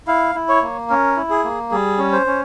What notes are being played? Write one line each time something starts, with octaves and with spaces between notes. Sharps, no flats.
E4 F5
E4
C#5
A#3
C#4 A#4
E4
G#4
A#3
G3 G#4
C#4
C5
C#4